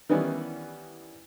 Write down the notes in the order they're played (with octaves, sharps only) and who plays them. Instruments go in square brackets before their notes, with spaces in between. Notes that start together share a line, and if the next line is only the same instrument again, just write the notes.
[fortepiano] D#3 E3 G3 B3 C#4 E4